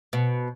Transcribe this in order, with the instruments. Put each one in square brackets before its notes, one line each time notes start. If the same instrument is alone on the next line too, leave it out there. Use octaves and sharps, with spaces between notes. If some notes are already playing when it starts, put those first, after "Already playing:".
[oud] B2